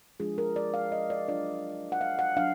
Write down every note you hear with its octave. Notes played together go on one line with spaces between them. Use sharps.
F3 G#3 D4 F4 G#4
A#4
D5
F5
D#5
D5
F#3 D4 F4 D5
F#5
F5
F#5
F#3 D4 F5